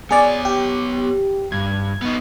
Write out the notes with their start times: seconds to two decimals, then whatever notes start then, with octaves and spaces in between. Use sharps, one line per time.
0.11 B3 G#4 C#5 D5
0.45 G4
1.52 G2 G#6
2.02 B3 D#4